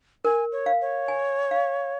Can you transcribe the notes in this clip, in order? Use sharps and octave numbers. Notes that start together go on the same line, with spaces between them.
A#4 G#5
C#5
F5
C#5
G#5
F5